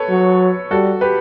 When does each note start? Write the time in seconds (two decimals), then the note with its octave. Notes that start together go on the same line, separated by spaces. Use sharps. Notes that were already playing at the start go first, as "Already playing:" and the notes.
Already playing: A4 B4 C#5
0.10 F#3
0.71 G3 F#4 A4
1.01 G4 B4